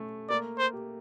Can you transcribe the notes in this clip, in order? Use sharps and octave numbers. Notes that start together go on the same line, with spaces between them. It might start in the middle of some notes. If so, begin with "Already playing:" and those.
Already playing: A3 C#4
A#3 D5
C5
G4